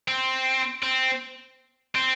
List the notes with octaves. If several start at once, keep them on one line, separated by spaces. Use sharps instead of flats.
C4
C4
C4